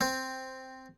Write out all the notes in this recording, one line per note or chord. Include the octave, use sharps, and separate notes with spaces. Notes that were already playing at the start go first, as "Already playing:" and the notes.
C4